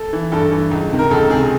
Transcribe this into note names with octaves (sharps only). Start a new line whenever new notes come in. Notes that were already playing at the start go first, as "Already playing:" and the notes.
Already playing: A4
E3
G2 A4
E3
C#2
C3 D#3
A#4
C#2 A4
C3 D#3 G#4